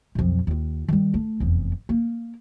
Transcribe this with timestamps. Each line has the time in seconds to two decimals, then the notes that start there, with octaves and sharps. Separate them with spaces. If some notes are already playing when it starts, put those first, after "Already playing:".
0.15 B1 F2
0.47 D#2 F4
0.88 D#3 G3
1.14 A3
1.40 F1 E2
1.89 A#3